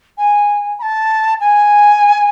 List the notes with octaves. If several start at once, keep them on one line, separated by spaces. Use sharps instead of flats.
G#5
B5
A5
G#5